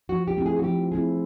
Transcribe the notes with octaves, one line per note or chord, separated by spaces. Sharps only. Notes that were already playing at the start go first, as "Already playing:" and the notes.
F3 F#4
G4
A3 C4 E4
G#4
F#4
F3 G4
A3 C4 E4 G#4